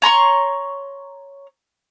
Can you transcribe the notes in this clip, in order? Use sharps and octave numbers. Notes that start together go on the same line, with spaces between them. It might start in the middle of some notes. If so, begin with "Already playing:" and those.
C#5 A#5 C6 C#6